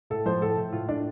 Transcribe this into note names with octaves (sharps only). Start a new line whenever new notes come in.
A2 A4
F3 C5
A2 A4
A2
A2 F4
A2 D4